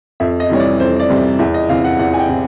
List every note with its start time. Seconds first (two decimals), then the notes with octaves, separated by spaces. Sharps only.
0.20 F2 E5
0.40 D#5
0.50 C3 E3 G3 C#5
0.60 D5
0.80 F2 C5
1.00 D5
1.10 C3 E3 G3
1.39 E2 E5
1.54 D#5
1.69 C3 E3 F5
1.84 F#5
1.99 E2 F#5
2.14 G#5
2.19 G5
2.29 C3 E3